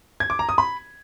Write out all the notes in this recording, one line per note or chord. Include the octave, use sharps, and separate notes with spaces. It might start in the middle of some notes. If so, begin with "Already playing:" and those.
G#6
D6
A#5
D#6
B5